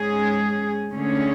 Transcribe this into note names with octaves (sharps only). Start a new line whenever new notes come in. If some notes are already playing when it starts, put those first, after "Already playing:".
Already playing: G#2 G#3 C#4 G#4
D2 D3 A3 C#4 G#4